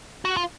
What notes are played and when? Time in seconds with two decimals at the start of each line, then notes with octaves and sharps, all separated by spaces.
0.25 F#4
0.37 F4